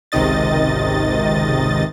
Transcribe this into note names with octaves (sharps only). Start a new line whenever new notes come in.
G#1 C#2 C3 D#3 D#5 A6